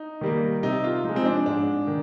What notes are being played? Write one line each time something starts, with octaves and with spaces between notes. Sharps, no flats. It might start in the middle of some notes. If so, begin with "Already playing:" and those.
Already playing: D#4
D#3 G3 A#3
C3 D#4
F4
F3 G#3 D#4
C4
D4
G#2 D4
D#3